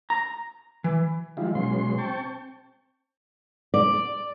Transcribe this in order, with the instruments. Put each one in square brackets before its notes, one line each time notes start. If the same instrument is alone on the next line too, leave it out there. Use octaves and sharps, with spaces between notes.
[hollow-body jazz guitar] A#5
E3
[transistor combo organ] D#3 F3 G3 G#3 E4 F4
B2 F#3 G#3 C#4 C6
C4 G5 A5 C#6
[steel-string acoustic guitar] D5